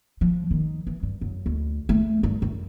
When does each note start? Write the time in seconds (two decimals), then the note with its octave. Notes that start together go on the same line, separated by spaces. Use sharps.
0.21 F3
0.51 D#3
0.87 E3
1.03 G2
1.21 F#2
1.46 D2
1.89 A3
2.23 G2
2.42 F#2